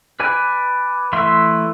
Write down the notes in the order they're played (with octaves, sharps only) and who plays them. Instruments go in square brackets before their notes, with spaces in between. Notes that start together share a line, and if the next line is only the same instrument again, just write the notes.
[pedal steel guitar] B4 D5 G#5
E3 A3 E5 C6